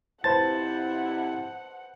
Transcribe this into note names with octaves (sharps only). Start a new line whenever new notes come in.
F2 C3 E4 B4 C5 F#5 A5 A6